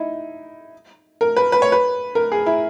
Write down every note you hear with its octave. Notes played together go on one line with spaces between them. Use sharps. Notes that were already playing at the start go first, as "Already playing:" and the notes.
Already playing: D#4 E4
A#4
B4
B4
C#5
B4
A#4
G#4
E4